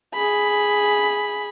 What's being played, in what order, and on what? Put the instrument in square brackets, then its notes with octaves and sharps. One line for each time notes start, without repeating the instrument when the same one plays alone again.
[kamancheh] G#4 B5